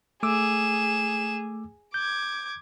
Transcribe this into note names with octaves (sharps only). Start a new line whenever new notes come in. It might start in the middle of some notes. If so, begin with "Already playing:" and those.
A3 G#4 D6 E6 E7
D6 G6 G#6